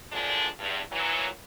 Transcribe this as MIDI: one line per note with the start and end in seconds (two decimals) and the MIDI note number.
0.12 0.46 42
0.12 0.46 46
0.12 0.46 50
0.12 0.46 53
0.12 0.46 56
0.12 0.46 62
0.59 0.79 40
0.59 0.79 43
0.91 1.26 46
0.91 1.26 52
0.91 1.26 54